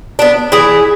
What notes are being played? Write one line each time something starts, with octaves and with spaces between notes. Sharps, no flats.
B3 D4
E3 E4 G#4